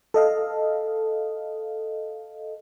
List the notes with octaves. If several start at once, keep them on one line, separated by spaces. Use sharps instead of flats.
A4 D#5 F5